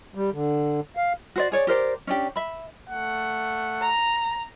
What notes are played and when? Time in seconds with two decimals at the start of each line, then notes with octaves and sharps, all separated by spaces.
0.15 G3
0.33 D3
0.97 F5
1.36 F#4 C5 D5
1.52 G#4 C#5 D5
1.67 G4 A#4 C5 D5
2.07 C#4 D4 G4
2.36 E5 B5
2.90 A3 F#5
3.81 A#5